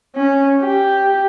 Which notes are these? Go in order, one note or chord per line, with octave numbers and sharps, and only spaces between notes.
C#4
G4